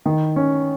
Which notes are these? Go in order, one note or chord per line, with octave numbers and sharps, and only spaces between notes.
D#3
C#4